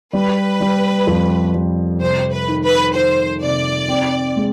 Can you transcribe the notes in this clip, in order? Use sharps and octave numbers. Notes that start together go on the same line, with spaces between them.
G3 B4
G3
F2
G3
C3 C5
B4
D#3
B4
D#3 C5
C3 D5
C4
G#3